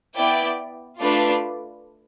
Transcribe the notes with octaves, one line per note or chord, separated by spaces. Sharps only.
B3 E4 B4 D5 G5
A3 D4 F4 B4 D5